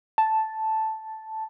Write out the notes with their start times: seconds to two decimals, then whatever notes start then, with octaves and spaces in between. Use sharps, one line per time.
0.18 A5